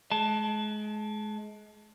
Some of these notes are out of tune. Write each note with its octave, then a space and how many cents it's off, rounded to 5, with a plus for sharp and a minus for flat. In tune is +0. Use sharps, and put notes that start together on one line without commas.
G#3 +30 A5 +0